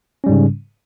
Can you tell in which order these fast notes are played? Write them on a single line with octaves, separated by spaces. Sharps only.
C#4 G3 G#2 C#3